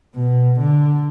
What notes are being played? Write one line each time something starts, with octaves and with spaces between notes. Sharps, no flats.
B2
D3